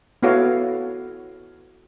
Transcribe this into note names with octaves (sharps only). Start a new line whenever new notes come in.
B3 E4 F#4 A4 C#5 F5